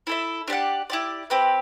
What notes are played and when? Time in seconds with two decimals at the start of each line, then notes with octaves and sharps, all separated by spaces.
0.07 E4 A4 E5
0.48 D4 G4 D5 F#5
0.90 E4 G4 D5
1.30 C4 G4 B4